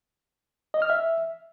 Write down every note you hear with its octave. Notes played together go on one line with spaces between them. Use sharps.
D#5
F6
E5